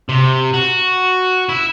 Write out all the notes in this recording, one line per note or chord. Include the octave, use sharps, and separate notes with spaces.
C3
F#4
E4